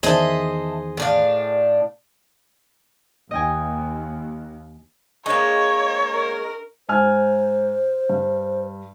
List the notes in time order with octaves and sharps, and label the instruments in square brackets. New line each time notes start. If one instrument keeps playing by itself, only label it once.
[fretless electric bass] E2 D#3 [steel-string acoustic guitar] G#4 C5 D#5 [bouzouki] E5 A5
[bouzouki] A2 D4 F5
[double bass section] D#2 [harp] D#5 G5 G#5
[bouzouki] G#3 A#3 [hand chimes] D4 D#5 C#6 [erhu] C#5
[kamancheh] A#4
[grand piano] G#2 G#5 F6 [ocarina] C5
[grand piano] G2